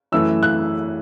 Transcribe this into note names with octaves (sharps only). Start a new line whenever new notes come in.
F#2 E3 A3 E6
F#6